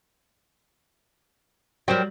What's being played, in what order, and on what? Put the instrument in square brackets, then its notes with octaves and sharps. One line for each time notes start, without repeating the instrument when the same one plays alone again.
[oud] F#3 G3 [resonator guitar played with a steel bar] A#4 C5 G5